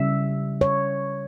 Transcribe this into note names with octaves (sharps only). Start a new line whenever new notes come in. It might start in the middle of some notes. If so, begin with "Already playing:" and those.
Already playing: C#3 G3 E5
C#5